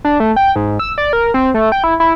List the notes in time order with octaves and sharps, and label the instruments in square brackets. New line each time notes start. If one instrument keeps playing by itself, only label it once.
[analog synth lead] D4
A3
G5
G#2
E6
D5
A#4
C4
A3
G5
E4
E4